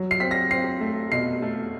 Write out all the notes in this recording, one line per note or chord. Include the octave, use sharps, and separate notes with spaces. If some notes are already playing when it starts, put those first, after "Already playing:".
Already playing: F#3
C7
C4 B6
A#6
C4 C7
A3
B2 C7
A3